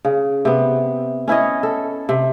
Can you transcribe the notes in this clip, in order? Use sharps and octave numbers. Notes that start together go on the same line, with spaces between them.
C#3
C3 B3
C#4 E4 C#5 D#5
A4
C3